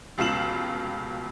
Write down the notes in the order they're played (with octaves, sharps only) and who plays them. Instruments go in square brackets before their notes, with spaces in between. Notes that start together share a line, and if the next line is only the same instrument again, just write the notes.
[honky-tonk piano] F1 C#2 B2 F5 E7 F#7